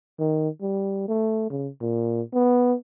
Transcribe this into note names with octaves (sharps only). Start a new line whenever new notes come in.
D#3
G3
A3
C#3
A#2
B3